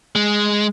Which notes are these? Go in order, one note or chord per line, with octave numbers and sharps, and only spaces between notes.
G#3